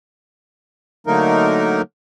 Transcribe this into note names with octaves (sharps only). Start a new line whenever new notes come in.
D3 F#3 A3 A#3 D#4 A#4